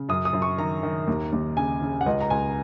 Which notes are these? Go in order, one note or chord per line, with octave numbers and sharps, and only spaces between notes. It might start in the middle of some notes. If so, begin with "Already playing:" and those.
Already playing: C#3
F#2 D#6
D#6
F#2
C#6
D#3 A#5
D#3
D#2
D#2
C#3 G#5
C#3
F#5
C#2 D#5
A#5
C#2 G#5